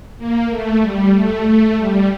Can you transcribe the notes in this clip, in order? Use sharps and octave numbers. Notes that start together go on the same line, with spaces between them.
A#3
A3
G3
A3
A3
G3